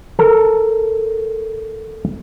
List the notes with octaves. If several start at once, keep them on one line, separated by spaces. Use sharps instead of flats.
A4 A#4